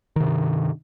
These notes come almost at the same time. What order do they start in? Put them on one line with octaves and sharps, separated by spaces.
D#3 C3 G2